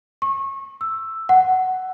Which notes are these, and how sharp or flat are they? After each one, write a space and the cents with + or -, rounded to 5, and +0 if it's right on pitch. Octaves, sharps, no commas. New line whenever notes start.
C#6 -30
E6 +5
F#5 +10